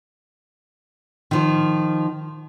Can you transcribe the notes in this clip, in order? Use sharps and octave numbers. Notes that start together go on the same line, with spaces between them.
D#3 F3